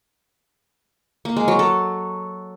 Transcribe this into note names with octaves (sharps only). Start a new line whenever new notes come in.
A#3
G#3
F#3
A4